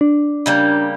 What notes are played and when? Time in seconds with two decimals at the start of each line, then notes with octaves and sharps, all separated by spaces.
0.01 D4
0.46 C#3 G3 A#3